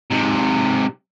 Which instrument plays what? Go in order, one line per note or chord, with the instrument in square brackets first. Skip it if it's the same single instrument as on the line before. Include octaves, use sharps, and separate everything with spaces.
[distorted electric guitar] G#2 C3